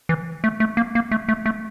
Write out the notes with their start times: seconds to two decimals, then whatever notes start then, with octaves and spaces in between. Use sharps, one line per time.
0.09 E3
0.44 A3
0.60 A3
0.77 A#3
0.95 A#3
1.11 A3
1.29 A3
1.46 A3